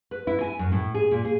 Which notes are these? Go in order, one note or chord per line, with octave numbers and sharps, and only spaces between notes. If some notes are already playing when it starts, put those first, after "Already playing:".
B4
E4
G#5
F#2
A2
G#4
A#2
G#4